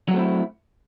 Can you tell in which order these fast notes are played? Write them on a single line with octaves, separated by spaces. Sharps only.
F#3 F#4 A3 C4 E4